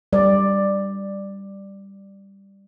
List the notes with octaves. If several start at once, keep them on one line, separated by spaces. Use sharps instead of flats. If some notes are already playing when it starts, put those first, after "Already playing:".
G3 D5